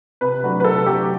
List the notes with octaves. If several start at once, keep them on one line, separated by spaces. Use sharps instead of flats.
C3 B4
F#3 A3 D4 F#4
B4
C3 A4
F#3 A3 D4 F#4 G4